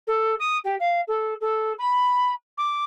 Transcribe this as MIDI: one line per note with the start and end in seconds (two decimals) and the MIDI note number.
0.07 0.34 69
0.39 0.57 87
0.64 0.75 67
0.79 1.00 77
1.07 1.34 69
1.40 1.72 69
1.78 2.31 83
2.57 2.84 86